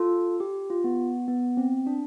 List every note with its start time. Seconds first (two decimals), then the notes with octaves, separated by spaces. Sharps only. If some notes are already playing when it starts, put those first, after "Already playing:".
Already playing: F4 A4
0.40 G4
0.70 F4
0.84 B3
1.28 B3
1.57 C4
1.87 D4